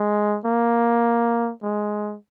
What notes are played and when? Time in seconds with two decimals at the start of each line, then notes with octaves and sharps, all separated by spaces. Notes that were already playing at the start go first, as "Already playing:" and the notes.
Already playing: G#3
0.45 A#3
1.63 G#3